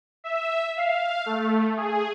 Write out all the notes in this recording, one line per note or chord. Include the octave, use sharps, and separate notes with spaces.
E5
F5
A3
G#4